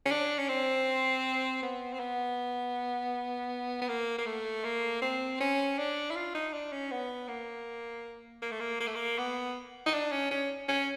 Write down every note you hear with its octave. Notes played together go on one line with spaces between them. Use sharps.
C#4
D4
C#4
C4
B3
C4
B3
B3
A#3
A#3
A3
A#3
C4
C#4
D4
E4
F4
D#4
D4
C#4
B3
A#3
A#3
A3
A#3
A#3
A3
A#3
B3
D#4
D4
C#4
C#4
C#4